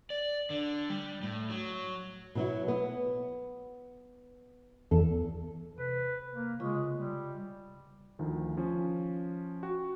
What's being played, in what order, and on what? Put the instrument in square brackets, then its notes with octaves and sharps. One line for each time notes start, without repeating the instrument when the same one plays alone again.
[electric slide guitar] D5
D3
G3
A2
F#3
[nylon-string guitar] B2 F#3 E4
B3
[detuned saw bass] E2 [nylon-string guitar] A4
[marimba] C3 [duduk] B4
[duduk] A#3
[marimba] C#3 F4 C#6 [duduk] G#3
[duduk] G3
[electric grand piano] D2 D#3 F3
F3 C#4
F#4 G5